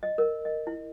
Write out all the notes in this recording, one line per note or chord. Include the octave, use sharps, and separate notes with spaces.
D#5
A#4
D#5
E4